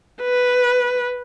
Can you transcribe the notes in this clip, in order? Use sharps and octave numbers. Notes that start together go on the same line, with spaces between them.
B4